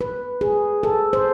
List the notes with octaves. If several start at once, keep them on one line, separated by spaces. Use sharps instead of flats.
B4
G#4
A4
C5